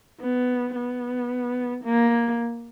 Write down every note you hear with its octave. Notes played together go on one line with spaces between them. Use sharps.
B3
B3
A#3